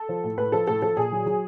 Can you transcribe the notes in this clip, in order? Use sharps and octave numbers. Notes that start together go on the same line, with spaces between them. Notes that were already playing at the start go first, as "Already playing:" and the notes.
Already playing: A4
F3
A2
A2 B4
F3 A4
A2 A4
F3 A4
A#2 G#4
F#3
F#3